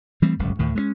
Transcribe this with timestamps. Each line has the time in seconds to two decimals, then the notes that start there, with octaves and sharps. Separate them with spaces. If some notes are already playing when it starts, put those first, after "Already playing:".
0.22 E3 G3 A3 C4
0.39 D1 G1 C#2 F#2
0.59 D2 A2 D#3
0.75 G#3 A3 C#4